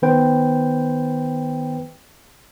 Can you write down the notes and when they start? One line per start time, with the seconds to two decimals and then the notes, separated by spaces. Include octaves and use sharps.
0.02 D#3 B3 B4 C5 G5